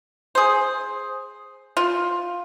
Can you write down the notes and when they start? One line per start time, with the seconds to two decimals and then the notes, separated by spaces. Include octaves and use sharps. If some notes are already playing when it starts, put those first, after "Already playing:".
0.35 G#4 C5
1.77 F4